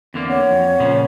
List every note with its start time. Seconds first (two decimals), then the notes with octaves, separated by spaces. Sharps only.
0.14 E2 D3 A#3 C4
0.28 C#5 F#5
0.51 F2
0.80 A#2 C#3 F3